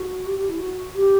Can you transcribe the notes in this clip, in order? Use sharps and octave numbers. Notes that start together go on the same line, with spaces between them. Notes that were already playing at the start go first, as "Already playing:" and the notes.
Already playing: F#4
G4
G4
E4
F#4
G4